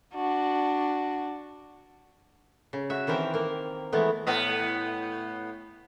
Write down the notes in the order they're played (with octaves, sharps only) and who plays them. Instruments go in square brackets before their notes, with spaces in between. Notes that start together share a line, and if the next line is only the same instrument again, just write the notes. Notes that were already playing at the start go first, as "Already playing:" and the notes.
[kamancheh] D4 F#4
[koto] C#3
F#4 E5
D#3 E3 C4 A#4 G5
A#3 A#4
E3 G#3 A3 B3
[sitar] A2 B3 D#5